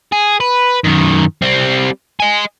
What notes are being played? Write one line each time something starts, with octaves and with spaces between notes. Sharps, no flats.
G#4
B4
F#2 D#3
G3 C4
D#5 G#5